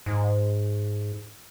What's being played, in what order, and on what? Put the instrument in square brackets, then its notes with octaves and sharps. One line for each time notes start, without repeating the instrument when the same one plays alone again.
[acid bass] G#2